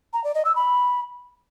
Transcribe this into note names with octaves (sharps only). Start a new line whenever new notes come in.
A#5
D5
D#5
E6
B5